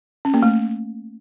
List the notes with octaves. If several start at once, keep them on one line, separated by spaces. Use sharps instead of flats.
C#4
A#3
A3